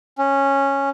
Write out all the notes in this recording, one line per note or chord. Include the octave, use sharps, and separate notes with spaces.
C#4